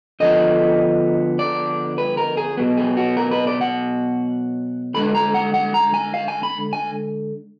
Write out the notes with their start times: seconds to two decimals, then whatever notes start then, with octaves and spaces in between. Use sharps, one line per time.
0.20 D3 F3 B3 D4 D#5
1.39 D5
1.98 B4
2.17 A#4
2.37 G#4
2.57 B2 F#3 B3
2.77 G#4
2.97 F#4
3.17 A#4
3.31 B4
3.47 D5
3.61 F#5
4.94 D3 G#3 D4 B5
5.15 A#5
5.34 F#5
5.54 F#5
5.74 A#5
5.94 G#5
6.14 F5
6.28 G#5
6.43 B5
6.73 G#5